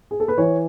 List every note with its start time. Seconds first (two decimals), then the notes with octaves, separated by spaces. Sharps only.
0.11 G#4
0.20 A4
0.28 B4
0.38 E3 C#5